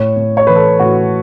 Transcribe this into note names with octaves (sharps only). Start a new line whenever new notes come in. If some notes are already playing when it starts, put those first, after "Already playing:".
Already playing: A2 C#5
A2
C#5
E3 B4
A4
A2 F#4